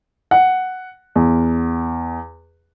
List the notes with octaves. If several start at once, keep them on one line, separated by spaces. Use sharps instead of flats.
F#5
E2